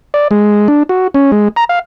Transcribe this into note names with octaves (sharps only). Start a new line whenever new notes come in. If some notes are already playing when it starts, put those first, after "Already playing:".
D5
G#3
D4
F#4
C#4
G#3
A#5
F5